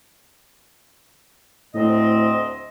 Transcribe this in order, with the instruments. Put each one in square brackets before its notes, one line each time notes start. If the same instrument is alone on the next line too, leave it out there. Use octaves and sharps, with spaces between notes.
[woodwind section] D2 C4 D#5 [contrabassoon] A2